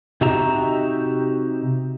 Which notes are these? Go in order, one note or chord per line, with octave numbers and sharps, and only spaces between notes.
C3 D#4 F#4 G4 E5 A#5